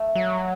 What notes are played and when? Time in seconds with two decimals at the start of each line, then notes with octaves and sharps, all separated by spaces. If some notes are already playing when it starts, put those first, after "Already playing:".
Already playing: A3
0.16 F#3